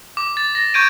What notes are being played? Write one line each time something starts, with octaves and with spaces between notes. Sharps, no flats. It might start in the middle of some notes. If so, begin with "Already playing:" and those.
D6
A6
A#6
C#6 G6 G#6 D7 D#7